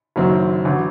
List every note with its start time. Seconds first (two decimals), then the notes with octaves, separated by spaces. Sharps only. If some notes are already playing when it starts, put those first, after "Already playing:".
0.16 F#1 F#2 D#3 F#3 C4
0.65 A1 D3 F#3